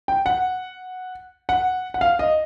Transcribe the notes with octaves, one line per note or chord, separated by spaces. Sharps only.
G5
F#5
F#5
F#5
F5
D#5